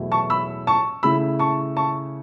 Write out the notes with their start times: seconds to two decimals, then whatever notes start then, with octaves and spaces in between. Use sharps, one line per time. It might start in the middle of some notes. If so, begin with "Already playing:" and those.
Already playing: E2 B2 F#3 A3 E4
0.12 A5 C#6
0.30 B5 E6
0.67 A5 C#6
1.03 C#3 A3 E4 B5 E6
1.39 A5 C#6
1.77 A5 C#6